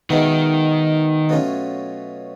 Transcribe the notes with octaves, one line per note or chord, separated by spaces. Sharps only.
B2 D#3 G#3 B3 E4
B2 F#3 A3 C#4 F4